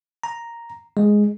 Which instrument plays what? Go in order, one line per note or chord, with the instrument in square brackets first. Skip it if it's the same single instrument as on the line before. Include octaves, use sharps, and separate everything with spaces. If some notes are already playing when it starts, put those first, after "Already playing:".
[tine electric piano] A#5
G#3